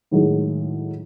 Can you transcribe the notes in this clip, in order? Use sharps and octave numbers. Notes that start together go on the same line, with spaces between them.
A2 D#3 F#3 G#3